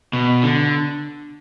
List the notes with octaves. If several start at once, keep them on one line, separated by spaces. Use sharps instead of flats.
B2
D3